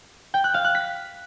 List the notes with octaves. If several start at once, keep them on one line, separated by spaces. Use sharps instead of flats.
G5
F#6
F5
F#6
B6